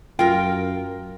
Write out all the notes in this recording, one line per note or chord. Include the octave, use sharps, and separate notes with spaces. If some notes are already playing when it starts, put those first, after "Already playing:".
F#2 F4 A#4 G5